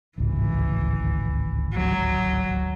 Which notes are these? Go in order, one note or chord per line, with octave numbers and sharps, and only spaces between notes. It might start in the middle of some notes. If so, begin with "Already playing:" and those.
D1 G#1 C#2 E3
F#3